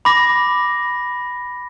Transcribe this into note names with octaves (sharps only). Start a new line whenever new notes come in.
B5 D6 A#6